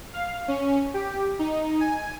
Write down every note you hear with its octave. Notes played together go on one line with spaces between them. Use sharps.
F5
C#4
G4
D#4
G#5